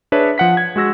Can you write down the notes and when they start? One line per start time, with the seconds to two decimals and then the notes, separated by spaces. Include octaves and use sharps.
0.12 D4 G#4 B4 C#5 E5
0.38 F3 F#5 B6
0.57 G#6
0.76 G#3 F#4 E6 A#6